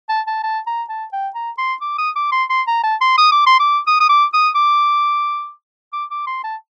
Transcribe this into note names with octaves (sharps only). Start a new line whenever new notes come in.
A5
A5
A5
A#5
A5
G5
A#5
C6
D6
D#6
D6
C6
C6
A#5
A5
C6
D#6
D6
C6
D6
D#6
D#6
D6
D#6
D6
D6
D6
C6
A5